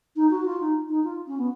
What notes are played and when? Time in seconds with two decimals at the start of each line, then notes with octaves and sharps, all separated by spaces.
0.16 D#4
0.31 F#4
0.45 F4
0.60 D#4
0.89 D#4
1.04 F4
1.27 C#4
1.38 B3